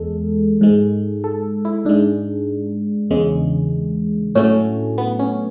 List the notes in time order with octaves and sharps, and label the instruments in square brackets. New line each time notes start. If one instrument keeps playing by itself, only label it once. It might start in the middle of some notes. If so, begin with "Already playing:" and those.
Already playing: [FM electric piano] E2 G#3 A4
G#2 G#3
A4
E4
G#2 G#3 D4
E2 C#3 G#3
A2 F#3 A3 C#4
B3
C#4